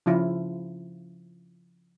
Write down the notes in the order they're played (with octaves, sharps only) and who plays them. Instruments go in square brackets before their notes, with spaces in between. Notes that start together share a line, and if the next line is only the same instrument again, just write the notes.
[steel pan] C#3 F3 E4 F4